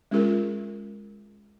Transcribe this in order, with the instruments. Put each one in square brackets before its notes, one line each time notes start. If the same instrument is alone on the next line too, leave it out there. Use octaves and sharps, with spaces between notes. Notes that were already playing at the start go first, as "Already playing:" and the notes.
[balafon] G#3 C#4 F4 G#4 A#4